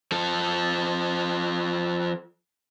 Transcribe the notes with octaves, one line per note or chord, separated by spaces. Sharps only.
F3 A4